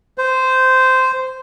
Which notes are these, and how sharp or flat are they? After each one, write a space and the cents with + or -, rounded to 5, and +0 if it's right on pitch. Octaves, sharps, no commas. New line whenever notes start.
C5 -10